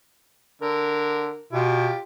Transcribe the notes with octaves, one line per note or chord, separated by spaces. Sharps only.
D3 A#4
B2 F4 G4